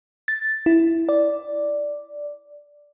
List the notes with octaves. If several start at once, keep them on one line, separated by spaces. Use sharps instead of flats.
A6
E4
D5